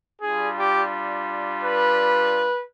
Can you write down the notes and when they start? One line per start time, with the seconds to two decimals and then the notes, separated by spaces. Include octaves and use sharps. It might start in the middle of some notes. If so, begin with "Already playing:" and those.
0.21 G3 D4 F4 G#4
0.57 G4
1.64 B4